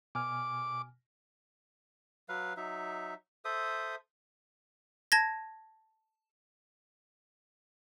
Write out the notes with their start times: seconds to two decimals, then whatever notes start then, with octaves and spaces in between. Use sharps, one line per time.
0.15 B2 G#5 D6 F6
2.29 F#3 B4 F5
2.57 F#3 D#4 E5
3.45 A4 C5 E5 D#6
5.12 A5 G#6 A#6